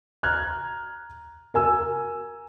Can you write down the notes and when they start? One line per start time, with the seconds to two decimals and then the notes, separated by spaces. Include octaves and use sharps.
0.23 A#5 F6 F#6 G#6
1.54 A#4 G#5 E6